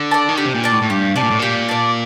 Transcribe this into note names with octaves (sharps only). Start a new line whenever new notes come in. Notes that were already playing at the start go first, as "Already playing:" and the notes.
Already playing: D3
D5 A5
D#3
D3 G4
C3
A#2
D5 A5
A2
A2
G2 G4
C3 D5 A5
A#2
A2
A#2 G4
D5 A5